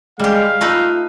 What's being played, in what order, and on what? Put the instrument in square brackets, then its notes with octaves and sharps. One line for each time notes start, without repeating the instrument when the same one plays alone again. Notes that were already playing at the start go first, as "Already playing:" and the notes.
[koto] G3 G4 [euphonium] G#3 [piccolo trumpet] F5
[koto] A3 D#4 B4 [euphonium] F4